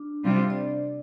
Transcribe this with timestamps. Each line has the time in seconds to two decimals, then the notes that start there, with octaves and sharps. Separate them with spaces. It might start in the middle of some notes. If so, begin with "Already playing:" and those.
Already playing: D4
0.24 C3 G3 C4 F4
0.50 D5